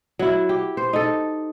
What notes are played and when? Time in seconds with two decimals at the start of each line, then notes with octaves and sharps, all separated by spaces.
0.19 F#3 E4
0.49 G4
0.77 C5
0.93 D#4 A4